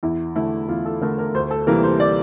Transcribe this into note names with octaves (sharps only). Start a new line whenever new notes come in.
E2 E4
D3 A3 E4
E2 F4
A4
D3 A3 A#4
A#4
D2 C5
A4
C3 E3 G3 A#3 A#4
C5
D5